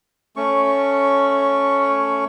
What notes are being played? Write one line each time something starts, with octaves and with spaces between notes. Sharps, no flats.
A3 C#4 C#6